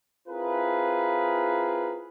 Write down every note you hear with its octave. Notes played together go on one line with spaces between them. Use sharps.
C4 E4 F4 G#4 A#4 B4